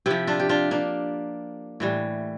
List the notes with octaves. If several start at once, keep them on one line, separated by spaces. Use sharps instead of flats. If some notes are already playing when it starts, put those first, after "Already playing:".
C3 F3 E4 G4
D4 F4
G4
D4 F4
A#3 D4
A2 E3 G3